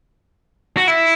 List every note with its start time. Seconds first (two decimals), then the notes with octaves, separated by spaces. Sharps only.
0.77 F#4
0.88 E4